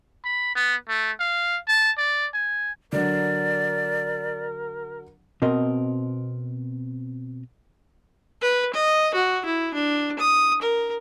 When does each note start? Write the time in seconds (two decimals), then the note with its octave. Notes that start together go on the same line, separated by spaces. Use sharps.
0.24 B5
0.55 B3
0.88 A3
1.20 F5
1.68 A5
1.98 D5
2.34 G#5
2.92 D3 F#3 A#4 D5
5.42 B2 C4 A#4 D#5
8.42 B4
8.74 D#5
9.14 F#4
9.45 E4
9.74 D4
10.19 D#6
10.62 A#4